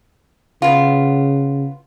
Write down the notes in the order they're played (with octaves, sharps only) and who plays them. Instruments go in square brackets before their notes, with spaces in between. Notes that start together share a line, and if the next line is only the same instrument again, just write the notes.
[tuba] C#3 [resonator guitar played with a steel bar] B3 F4